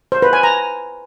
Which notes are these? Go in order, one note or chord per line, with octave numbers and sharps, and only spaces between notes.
C5
B4
G#5
A#5